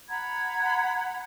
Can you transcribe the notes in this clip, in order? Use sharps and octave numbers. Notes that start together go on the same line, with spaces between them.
F#5 A#5 B5 G#6